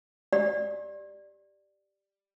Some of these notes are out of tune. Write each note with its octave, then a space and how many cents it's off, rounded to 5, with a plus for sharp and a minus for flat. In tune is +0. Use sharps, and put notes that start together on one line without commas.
G4 +0 D5 +10